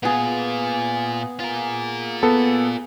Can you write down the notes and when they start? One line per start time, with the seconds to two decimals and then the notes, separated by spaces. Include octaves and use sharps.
0.03 A#2 B3 F4 G#4
1.40 F4 A#4
2.23 B3 A4